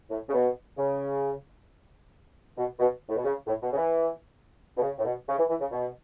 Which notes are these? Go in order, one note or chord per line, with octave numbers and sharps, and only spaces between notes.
A2
C#3
B2
C#3
B2
B2
A2
B2
C#3
A2
B2
C#3
E3
B2
C#3
A2
B2
C#3
E3
E3
C#3
B2